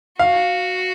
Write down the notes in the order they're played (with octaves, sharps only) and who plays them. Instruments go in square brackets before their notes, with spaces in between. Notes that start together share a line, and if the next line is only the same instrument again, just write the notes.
[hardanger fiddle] F#4 [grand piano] F5